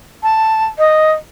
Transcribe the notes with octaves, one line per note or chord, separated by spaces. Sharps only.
A5
D#5